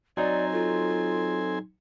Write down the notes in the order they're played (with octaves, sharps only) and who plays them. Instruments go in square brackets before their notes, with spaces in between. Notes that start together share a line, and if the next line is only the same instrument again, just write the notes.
[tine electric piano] F#3 D#4 [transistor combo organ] C4 G#5 [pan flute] D5
[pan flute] F4 [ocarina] A4